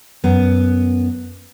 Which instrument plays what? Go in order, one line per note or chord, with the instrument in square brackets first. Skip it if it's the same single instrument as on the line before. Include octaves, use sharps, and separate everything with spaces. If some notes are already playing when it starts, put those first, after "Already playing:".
[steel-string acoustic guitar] F#2 B3